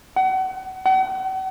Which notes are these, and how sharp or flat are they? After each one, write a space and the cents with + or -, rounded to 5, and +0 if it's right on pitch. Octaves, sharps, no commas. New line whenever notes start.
F#5 +35
F#5 +45